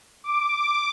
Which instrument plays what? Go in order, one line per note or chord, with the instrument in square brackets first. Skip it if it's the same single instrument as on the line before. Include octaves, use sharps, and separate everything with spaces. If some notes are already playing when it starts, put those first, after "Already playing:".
[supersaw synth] D6